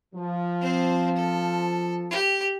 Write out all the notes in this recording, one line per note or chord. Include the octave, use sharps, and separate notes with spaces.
F3
C4 C5
A4
G4